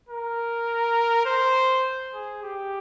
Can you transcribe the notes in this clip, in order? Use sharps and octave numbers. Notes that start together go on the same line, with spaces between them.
A#4
C5
G#4
G4